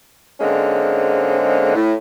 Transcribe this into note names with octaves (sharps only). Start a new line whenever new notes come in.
G#2 D3 G#3 A#3 C4 C#4
A2